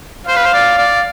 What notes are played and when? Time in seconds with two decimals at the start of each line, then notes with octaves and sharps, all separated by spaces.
0.28 C5 F5
0.36 B4
0.45 C5
0.54 D5
0.78 D5